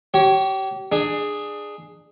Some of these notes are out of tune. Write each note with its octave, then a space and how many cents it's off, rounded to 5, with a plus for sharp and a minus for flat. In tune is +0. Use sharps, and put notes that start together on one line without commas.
G4 -30 C#5 +0
D4 +25 G#4 +0